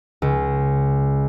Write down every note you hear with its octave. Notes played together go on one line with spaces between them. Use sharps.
C#2